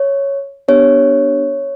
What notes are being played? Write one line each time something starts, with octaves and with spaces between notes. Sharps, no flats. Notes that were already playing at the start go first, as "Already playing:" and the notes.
Already playing: C#5
B3 D4 G4 C#5